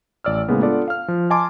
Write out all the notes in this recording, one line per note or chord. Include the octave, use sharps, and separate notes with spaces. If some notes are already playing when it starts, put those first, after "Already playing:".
A1 D5 E6 F6
A2 C#3 G#3 A#3 B3
B3 D4 F4 A4 D5
F5 F6
F3
D#5 G#5 A5 C6 D6